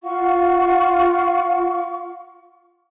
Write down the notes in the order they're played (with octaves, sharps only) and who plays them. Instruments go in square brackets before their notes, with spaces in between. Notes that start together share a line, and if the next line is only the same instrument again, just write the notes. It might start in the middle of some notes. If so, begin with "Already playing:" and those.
[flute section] F4 F5 F#5 C#6